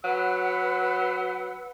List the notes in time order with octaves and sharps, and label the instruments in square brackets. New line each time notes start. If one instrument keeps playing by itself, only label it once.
[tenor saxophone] F#3 [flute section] B4 F#5 E6